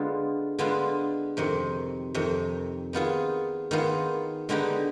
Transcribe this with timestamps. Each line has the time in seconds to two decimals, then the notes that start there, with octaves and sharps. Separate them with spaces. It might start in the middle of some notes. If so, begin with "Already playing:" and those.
Already playing: D3 G#3 B3 F4
0.58 D3 G#3 B3 F4
1.37 F2 C3 D#3
2.14 F2 C3 D#3
2.93 D#3 B3 F4 G#4
3.71 D#3 B3 F4 G#4
4.49 D3 G#3 B3 D#4 G4